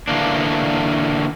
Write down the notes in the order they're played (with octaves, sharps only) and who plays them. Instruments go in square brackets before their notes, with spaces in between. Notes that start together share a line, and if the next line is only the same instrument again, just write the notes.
[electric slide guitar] D3 E3 A#3 D4